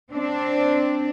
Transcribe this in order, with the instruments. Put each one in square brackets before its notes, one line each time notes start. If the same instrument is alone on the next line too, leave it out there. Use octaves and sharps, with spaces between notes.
[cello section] C4 D4